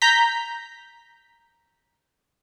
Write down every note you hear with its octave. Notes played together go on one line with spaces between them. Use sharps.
A#5 G6 B6